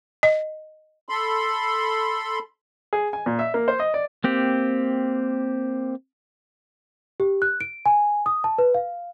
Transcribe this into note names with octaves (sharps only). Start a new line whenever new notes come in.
D#5
A4 B5 C6
G#4
G#5
A#2
E5
A#3
C5
D#5
D5
A#3 C4 G4
G4
F#6
D7
G#5
D#6
A5
B4
F5